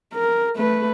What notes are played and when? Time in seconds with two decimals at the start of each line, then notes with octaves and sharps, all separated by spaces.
0.14 A#4
0.56 A3 B4